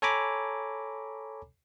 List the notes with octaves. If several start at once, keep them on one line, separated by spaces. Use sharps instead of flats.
A4 C#5 G#5 A#5 B5 D6